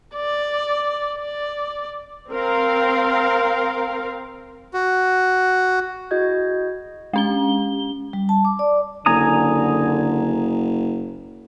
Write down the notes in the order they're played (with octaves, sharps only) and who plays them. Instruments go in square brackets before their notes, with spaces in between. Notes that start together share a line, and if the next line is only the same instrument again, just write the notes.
[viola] D5
D5
[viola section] C4 A#4 F5
[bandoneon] F#4
[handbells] E4 F#4 G#4 D#5 G6 G#6
[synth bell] G#3 C#4 G7
[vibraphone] G3
A5
D6
D5
[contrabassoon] F#1 [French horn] D3 [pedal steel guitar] G#5 A#5 D#6